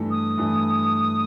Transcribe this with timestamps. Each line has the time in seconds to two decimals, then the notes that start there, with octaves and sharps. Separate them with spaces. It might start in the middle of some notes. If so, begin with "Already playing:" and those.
Already playing: G2 E3 A3
0.11 D#6
0.38 G2 E3 A3